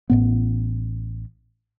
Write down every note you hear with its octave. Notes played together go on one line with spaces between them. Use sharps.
A1 A2 B3